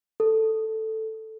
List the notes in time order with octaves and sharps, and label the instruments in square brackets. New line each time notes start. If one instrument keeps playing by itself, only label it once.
[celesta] A4